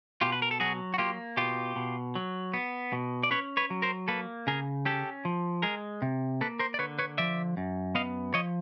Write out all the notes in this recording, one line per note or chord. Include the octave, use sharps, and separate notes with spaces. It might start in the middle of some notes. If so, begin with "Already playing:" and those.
B2 F4 G4
B4
A#4
A4
F#3 F#4 G#4
F#4
A#3 F4 G4
B2 F4 G4
B2
F#3
B3
B2
D5
C#4 B4 C#5
B4 C#5
F#3
A#4 C5
A#3 A4 B4
C#3 G#4 A#4
C#4 G4 A4
F3
G#3 G#4 A#4
C3
A#3 A4 B4
A#4 C5
D5
D3 B4 C#5
B4 C#5
F3 D5 E5
F#2
B3 D#5 F5
F3 C#5 D#5